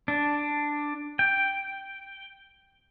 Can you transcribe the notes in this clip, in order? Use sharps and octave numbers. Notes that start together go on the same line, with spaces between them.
D4
G5